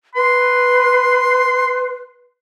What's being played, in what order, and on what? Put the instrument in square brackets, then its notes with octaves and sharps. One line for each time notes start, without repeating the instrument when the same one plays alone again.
[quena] B4 [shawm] C6